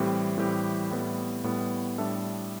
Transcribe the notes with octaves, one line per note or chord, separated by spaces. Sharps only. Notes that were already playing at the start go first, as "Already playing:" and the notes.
Already playing: A2 E3 G3 C4 G4
A2 E3 G3 C4 G4
A2 G3 B3
A2 G3 B3
A2 G3 D4 A4 E5